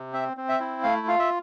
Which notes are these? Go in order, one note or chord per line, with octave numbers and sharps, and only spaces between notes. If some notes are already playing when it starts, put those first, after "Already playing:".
Already playing: C3
C4 E5
C4
E5
E4
A3 F5
F4 F5
E5